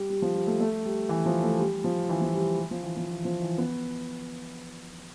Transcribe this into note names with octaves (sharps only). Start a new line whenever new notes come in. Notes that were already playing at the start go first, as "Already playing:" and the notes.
Already playing: G3
G3
F3
G3
A3
A3
G3
E3
F3
A3
G3
F3
E3
F3
G3
G3
F3
E3
F3
E3
F3
E3
B3